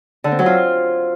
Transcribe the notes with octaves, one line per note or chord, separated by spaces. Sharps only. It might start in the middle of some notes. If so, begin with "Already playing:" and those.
D3
C4
F#3
F4